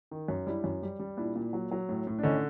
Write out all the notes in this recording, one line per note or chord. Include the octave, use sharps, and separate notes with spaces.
D#3
F#2
G3 D4 E4
F#2
G3
G3
A#2 D4 E4
A#2
F#3
F#3
A2
A2
D4
D3 C#4 D#4